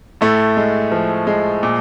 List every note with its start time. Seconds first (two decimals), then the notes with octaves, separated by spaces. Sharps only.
0.21 A2 A3
0.57 G#3
0.92 F3
1.27 G#3
1.63 A#2